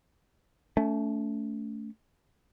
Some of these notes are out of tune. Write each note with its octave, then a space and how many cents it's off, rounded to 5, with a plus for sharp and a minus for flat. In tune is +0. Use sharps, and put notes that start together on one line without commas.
A3 +0 C#4 +35